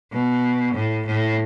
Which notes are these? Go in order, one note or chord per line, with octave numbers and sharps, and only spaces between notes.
B2
A2
A2